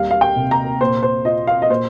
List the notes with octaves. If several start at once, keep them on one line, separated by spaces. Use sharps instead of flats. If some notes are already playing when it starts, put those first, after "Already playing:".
Already playing: D#2 G3 F5
F5
G5
C3
A#5
A#2 C5
C5
F4 D#5
F5
D#5
A#2 C5